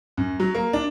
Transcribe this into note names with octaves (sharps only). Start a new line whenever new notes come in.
F#2
F#3
A#3
D4